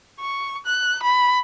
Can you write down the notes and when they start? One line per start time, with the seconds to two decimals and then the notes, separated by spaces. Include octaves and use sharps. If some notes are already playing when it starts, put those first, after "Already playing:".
0.20 C#6
0.66 F#6
1.03 B5